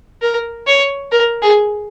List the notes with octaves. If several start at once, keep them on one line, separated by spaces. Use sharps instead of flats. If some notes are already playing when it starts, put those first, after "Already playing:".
A#4
C#5
A#4
G#4